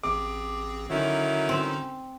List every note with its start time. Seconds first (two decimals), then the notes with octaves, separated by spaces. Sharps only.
0.03 A1 C4 G#4 D6
0.90 D3 D#3 F#3 C#4 D#4 E4
1.49 C4